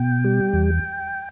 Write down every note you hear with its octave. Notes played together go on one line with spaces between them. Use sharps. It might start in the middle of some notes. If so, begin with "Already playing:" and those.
Already playing: B2 G5
G3
E2